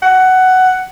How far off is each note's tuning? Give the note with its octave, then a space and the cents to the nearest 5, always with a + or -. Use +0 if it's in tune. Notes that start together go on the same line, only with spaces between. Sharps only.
F#5 +10